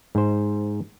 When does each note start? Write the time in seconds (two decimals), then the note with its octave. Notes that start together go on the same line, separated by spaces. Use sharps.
0.15 G#2 C5